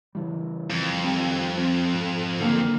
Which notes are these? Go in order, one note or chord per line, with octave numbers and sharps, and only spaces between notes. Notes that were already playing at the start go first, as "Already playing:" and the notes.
C#3 E3 G3
F2
D#3 G3 C4
C4
G#2
D3 D#3 F#3 A#3